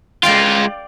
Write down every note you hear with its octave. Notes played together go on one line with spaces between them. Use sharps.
G#3 F4 D5 F5 G5